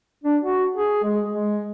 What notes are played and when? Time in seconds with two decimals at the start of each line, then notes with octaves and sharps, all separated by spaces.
0.24 D4
0.43 F#4
0.76 G#4
1.04 G#3
1.30 G#3